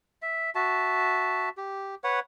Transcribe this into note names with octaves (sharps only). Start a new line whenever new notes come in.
E5
F#4 E5 A5
G4
B4 C#5 F#5